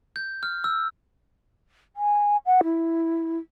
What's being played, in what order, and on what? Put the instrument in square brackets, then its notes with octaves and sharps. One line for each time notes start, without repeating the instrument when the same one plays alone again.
[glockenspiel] G6
F6
E6
[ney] G#5
F#5
E4